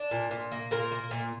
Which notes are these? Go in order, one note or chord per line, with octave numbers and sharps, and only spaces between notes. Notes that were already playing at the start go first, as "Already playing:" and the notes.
Already playing: D4
A#2
A#2
A#3
A#2 A#4
A#3
A#2